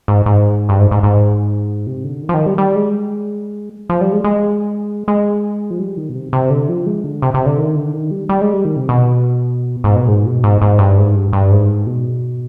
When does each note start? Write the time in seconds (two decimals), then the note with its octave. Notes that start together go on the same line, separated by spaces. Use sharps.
0.08 G#2
0.26 G#2
0.69 G2
0.79 G#2
0.91 G#2
1.03 G#2
1.87 C3
2.04 D3
2.22 D#3
2.29 F3
2.34 D#3
2.46 G3
2.58 G3
2.76 G#3
3.89 F3
4.01 G3
4.13 G#3
4.24 G#3
5.08 G#3
5.71 F3
5.79 G3
5.97 D#3
6.09 B2
6.15 C3
6.33 C3
6.50 D3
6.69 F3
6.86 G#3
7.04 D3
7.22 C3
7.34 C3
7.46 D3
7.58 D#3
7.76 D3
7.93 D#3
8.11 G3
8.29 G3
8.41 G#3
8.53 G3
8.65 D#3
8.76 C3
8.89 B2
9.84 G#2
9.96 B2
10.08 G#2
10.26 B2
10.44 G#2
10.62 G#2
10.79 G2
10.97 G#2
11.15 G2
11.33 G2
11.51 G#2
11.87 B2